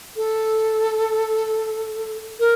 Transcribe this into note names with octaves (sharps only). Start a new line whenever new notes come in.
A4
A#4